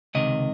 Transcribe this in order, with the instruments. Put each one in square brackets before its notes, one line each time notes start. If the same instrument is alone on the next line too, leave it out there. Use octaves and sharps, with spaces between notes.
[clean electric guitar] C#2 C3 D#3 D#5